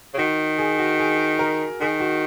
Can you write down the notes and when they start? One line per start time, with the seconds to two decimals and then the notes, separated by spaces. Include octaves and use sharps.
0.14 C#3
0.17 D#3 F#4
0.58 G#4
0.79 F#4
0.99 G#4
1.39 A#4
1.80 D#3 G#4
2.00 F#4